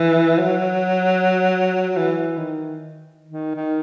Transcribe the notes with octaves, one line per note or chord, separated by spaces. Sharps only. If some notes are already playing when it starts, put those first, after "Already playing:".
Already playing: E3
F#3
E3
D#3
D#3
D#3